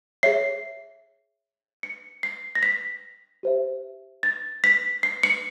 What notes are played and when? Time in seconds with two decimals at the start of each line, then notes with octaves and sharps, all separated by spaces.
0.23 G#4 C#5 E5 C7
1.83 C#7
2.23 C7
2.55 A#6
2.63 B6
3.43 G4 C5 E5
4.23 A6
4.64 B6
5.03 C7
5.23 C#7